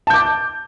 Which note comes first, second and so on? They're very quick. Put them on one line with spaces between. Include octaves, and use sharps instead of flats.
A5 G6 D6